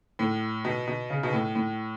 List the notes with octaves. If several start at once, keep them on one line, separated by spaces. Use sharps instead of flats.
A2
B2
B2
C#3
B2
A2
A2